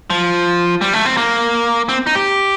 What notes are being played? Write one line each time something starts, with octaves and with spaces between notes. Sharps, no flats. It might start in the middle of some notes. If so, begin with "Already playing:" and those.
F3
G3
A3
C4
A#3
C4
D#4
G4